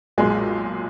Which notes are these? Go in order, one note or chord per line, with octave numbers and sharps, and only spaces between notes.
B1 A#2 G#3